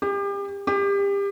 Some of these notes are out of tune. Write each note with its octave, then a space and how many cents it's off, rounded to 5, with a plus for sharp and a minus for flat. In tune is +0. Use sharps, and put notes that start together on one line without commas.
G4 +35
G4 +30